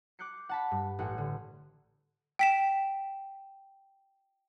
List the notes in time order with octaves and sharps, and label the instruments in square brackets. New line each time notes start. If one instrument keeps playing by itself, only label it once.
[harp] D6 F#6 G6 C7 C#7
F#5 A5 B5
G2
A1 F#5
D3
[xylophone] G5 B6 E7